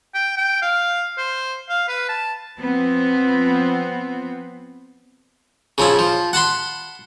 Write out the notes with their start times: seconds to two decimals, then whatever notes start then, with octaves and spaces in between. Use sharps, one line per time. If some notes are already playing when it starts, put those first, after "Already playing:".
0.15 G5
0.37 G5
0.62 F5
1.18 C5
1.69 F5
1.88 B4
2.09 A5
2.60 F3 B3 C4
5.78 C#3 F3 E4
5.99 F3
6.33 F#5 A5 B5 C6